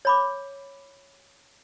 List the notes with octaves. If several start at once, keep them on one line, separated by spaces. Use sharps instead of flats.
C#5 B5 D6